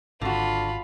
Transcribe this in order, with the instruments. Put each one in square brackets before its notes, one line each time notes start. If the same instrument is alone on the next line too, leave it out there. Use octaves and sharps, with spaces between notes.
[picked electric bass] G#1 [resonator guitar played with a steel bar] D3 F#4 [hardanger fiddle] F4 B5